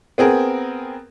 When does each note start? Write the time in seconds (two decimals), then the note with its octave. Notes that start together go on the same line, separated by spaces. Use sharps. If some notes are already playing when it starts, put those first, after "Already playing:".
0.18 B3 C4 G#4 A#4